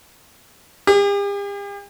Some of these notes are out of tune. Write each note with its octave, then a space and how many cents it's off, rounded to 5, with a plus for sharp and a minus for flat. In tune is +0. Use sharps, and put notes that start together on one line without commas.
G4 +45